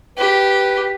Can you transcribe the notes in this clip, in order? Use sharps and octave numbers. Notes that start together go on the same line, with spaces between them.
G4 B4